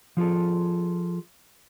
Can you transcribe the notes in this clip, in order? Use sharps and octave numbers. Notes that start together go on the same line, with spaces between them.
F3 F4 G#4 A4